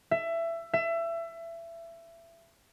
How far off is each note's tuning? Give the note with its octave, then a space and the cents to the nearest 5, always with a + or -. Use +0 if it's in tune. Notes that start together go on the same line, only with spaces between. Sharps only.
E5 +20
E5 +25